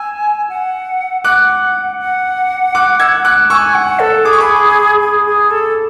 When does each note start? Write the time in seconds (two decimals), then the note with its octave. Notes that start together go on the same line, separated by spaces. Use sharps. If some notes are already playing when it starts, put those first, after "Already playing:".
Already playing: G#5 E6
0.50 F#5
1.24 F#5 D6 F#6
1.99 F#5
2.75 D6 F#6
3.00 E6 G#6
3.25 D6 F#6
3.50 G#5 C#6 E6
3.75 F#5
4.00 A4
4.25 G#4 D6
4.33 C#6
4.40 B5 D6
5.01 G#4
5.26 G#4
5.51 A4